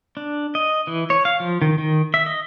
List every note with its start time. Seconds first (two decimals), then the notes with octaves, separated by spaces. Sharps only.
0.17 D4
0.55 D#5
0.87 E3
1.10 C#5
1.25 F5
1.40 F3
1.62 D#3
1.78 D#3
2.14 E5
2.26 D#5